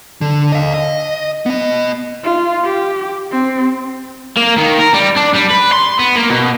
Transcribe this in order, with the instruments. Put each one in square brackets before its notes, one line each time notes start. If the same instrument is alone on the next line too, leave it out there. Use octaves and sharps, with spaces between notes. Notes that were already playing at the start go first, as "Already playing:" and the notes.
[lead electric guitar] D3
D#5 F5
D#5
B3 D#5
[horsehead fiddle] F4
G4
C4
[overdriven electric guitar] A#3
D#3
A#4
G3
D4
G3
B4
C6
B3
A#3
B2